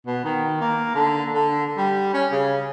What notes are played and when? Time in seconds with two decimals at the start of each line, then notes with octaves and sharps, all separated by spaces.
0.06 B2
0.24 D#3
0.61 A#3
0.94 D3
1.34 D3
1.77 G3
2.14 C#4
2.32 C#3